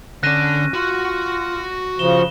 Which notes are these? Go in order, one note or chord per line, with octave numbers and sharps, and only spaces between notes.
D3 C#4 D4 F#6 A#6 D#7
F4 F#4 F#5
C#3 F3 E7 G7